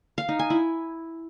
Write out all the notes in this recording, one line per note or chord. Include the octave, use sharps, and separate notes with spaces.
F5
D#4
G#5
E4